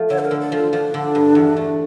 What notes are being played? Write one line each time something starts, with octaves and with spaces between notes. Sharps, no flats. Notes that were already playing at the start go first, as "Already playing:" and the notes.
Already playing: F3 A3
D3 C#5
A4
A#4
D3
A4
F3
F4
F3 D4
D3
G2
E2
A3